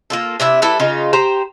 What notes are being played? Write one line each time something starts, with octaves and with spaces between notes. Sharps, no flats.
A#3 F4 A4
C3 D4 E4 E5
G3 E4 A4 B4
C#3 D#4 F4
G4 C5 A#5